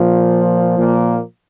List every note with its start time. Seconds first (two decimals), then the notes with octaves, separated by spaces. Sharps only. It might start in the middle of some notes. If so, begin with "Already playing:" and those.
Already playing: A#2 F3
0.79 A#2 A#3